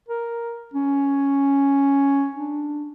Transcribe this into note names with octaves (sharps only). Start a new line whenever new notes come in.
A#4
C#4
D4